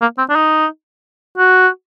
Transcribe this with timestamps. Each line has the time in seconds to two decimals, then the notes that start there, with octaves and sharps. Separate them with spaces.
0.01 A#3
0.18 C4
0.29 D4
0.35 D#4
1.37 F#4